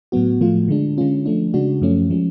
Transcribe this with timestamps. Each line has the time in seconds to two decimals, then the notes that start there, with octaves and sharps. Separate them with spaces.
0.12 A2 F#3 B3 F#4
0.41 A2 F3 A3 F4
0.68 D3 G#3 D4
0.98 D3 G#3 C#4 F4
1.26 F3 A3 D4
1.54 C#3 G#3 D4 F#4
1.82 F#2 F3 A3 C#4
2.10 F3 G#3 C#4